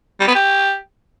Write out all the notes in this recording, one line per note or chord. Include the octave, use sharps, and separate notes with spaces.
G3
B3
G4